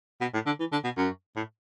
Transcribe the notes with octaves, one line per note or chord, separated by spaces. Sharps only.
B2
A2
D3
E3
D3
B2
F#2
A2